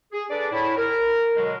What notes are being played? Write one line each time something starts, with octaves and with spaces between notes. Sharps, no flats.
G#4
D4 G#4 A4 B4 D5
A2 E4
A#4
B2 D3 F#3 G#3